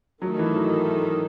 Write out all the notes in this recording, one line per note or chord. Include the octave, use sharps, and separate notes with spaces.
D#3 F#3 A3 D#4 A4
E3
F#3